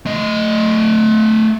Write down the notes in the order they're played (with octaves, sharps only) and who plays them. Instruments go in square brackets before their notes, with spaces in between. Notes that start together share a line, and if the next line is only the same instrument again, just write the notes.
[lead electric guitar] A3 D#5